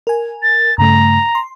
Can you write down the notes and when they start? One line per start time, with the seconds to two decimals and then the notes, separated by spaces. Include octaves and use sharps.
0.07 A#4 G#5
0.43 A6
0.78 G2 C#3 A3 A#5
1.35 C6